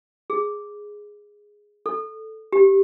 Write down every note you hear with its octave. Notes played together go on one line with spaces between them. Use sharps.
G#4
A4
G4